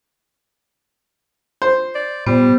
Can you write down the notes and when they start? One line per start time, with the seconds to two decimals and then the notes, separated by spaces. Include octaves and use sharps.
1.62 C5
1.95 D5
2.26 A#2 G3 B3 C5